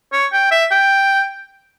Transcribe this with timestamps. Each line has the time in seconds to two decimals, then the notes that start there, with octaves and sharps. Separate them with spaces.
0.13 C#5
0.33 G5
0.51 E5
0.71 G5